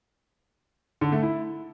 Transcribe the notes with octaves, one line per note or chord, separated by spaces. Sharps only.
D3
A3
E4